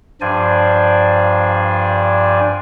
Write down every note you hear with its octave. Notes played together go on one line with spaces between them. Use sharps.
G2 F3 D4 C5 D5 G#5